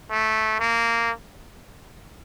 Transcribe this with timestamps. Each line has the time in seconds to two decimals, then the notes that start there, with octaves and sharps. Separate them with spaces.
0.11 A3
0.59 A#3